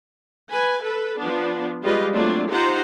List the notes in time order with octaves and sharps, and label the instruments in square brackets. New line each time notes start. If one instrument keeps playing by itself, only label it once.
[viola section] B4 G#5
A4 B4
F3 B3 D4
G3 G#3 F4 G4 B4 D#5
F#3 A3 A#3 C4 D4 F4
D#4 F4 G4 C5 F#5 A#5